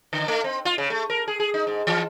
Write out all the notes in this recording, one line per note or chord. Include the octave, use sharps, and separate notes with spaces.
D3
A3
C4
F4
C#3
A3
A#4
G#4
G#4
D#4
G#2
E3